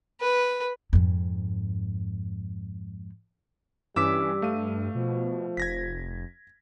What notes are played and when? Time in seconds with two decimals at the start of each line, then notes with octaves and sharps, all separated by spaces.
0.21 B4
0.93 F2 G#2
3.96 G2 E3 G3 C#4 D6 E6 B6
4.42 A3 F5 D#7
4.95 B2 F3
5.57 F1 G#6 A#6 B6